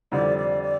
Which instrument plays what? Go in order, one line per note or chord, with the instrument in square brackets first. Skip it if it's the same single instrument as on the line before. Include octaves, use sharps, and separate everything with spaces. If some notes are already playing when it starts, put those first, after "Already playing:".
[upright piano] F2 D3 G3 C4 [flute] D5
[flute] D5
D5